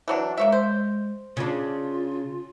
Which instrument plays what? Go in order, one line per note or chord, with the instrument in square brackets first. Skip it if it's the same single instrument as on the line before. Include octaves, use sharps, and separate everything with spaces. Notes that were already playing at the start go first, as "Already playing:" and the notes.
[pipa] E3 F#3 D4
[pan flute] G#3 [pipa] A#3 C#5 E5
[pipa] C5
[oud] C#3 D4 [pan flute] F4